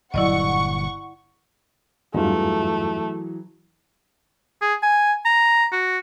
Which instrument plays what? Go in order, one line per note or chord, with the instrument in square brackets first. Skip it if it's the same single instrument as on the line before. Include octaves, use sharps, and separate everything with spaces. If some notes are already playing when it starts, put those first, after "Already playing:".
[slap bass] G1 A#2 F#3 [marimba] E4 D5 D#5 [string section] F#5 C#6
[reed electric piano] E2 G2 F4 [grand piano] E3 F#3 G#4 [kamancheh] A3
[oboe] G#4
G#5
A#5
F#4